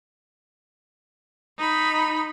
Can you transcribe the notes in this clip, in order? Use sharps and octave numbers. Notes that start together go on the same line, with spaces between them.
D#4 B5